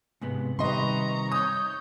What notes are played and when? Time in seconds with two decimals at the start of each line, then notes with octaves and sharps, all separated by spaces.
0.21 G#2 C3 B3
0.59 C3 D#3 G3 B4 D#5 A#5 C6 C#6
1.32 C#5 D#6 G6